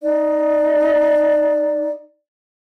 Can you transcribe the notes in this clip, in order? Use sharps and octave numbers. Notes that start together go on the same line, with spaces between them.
D#4 D5